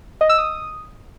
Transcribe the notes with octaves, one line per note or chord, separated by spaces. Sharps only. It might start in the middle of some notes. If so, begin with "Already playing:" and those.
D#5
E6
D#6